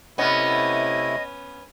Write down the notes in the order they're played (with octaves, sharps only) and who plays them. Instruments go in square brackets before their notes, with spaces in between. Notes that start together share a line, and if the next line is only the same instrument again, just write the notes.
[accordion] C3 A3 E4 [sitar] B3 C#4 [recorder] D#5